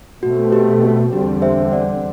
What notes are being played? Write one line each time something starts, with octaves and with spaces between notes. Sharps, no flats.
B2 A3 C4 F#4
G4
F#4
E2 D3 G3 C4 G4
C5 E5
D5 F#5